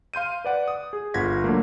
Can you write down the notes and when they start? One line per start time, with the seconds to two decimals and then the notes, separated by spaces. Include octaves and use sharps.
0.14 F5 C6 G6 D#7
0.44 B4 D5 F#5
0.68 D#6
0.93 G#4
1.14 G1 F4 F#5 G#6 A#6 B6
1.44 D3 F#3 A3 A#3